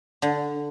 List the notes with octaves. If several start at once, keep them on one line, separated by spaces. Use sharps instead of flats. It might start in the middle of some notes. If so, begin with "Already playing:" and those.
D3